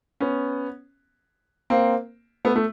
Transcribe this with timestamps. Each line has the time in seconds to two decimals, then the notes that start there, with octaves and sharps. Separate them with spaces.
0.20 B3 C#4
1.70 A#3 C4
2.45 A3 B3
2.56 A3